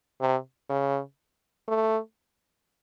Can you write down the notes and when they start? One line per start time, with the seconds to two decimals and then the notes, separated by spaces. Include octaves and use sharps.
0.21 C3
0.70 C#3
1.68 A3